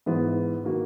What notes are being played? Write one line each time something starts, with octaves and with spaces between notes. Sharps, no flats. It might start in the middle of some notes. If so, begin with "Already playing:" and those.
G#2 E3 B3 E4
D#3 A#3 D#4 F#4